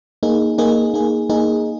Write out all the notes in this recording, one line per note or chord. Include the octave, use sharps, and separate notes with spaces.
A#3 D#4 G#4
A#3 D#4 G#4
A#3 D#4 G#4
A#3 D#4 G#4